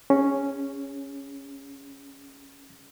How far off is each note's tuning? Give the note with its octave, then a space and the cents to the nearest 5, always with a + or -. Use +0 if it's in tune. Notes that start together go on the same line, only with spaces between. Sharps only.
C#4 +0 G#4 -25